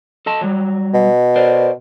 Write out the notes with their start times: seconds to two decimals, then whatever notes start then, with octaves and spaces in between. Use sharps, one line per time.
0.26 A4 D#5 A5
0.41 F#3 G3
0.94 B2
1.36 A#4 C5 D5